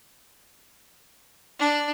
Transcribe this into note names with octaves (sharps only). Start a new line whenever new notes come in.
D4